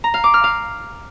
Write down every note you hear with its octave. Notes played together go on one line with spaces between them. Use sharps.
A#5
F5
D6
F6
F5